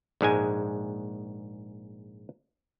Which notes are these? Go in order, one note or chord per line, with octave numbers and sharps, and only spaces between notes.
A#1 G#2 G#3 G#5